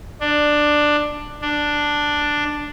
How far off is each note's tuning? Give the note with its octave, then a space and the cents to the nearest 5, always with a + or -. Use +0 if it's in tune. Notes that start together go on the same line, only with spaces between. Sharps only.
D4 +10
D4 +5